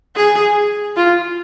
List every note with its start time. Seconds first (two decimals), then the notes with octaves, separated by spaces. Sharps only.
0.15 G#4
0.96 F4